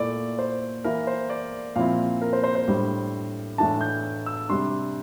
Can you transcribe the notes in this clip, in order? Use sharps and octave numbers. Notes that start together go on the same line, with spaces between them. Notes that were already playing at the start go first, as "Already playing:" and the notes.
Already playing: A#2 A3 E4 D5
C5
E3 A#3 E4 A#4
C5
D5
A#2 F3 C4 E4 F5
A#4
C5
C5
C5
A2 G3 D4
A2 E3 A3 D4 A5
G6
E6
C3 G3 D4 C6